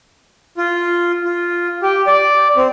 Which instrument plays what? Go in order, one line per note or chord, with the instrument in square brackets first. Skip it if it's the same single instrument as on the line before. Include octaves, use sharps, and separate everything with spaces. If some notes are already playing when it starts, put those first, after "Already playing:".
[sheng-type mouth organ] F4
F4
G4
D5
C4